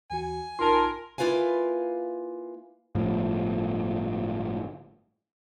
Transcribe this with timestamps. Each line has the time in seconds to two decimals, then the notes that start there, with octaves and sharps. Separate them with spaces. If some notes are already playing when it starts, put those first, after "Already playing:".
0.10 D#2 E3 F#4 G#5
0.59 A#1 D#4 F4 A#4 A5 C6
1.18 A#3 E4 F4 B4 F5 G#5
2.95 G1 A2 F3